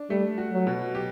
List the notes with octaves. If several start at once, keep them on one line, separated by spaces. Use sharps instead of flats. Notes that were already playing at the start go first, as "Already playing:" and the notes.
Already playing: D4
G3 A3
F#4
F#3
B2
G4